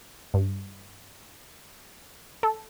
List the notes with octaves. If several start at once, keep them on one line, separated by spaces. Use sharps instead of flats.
G2
A4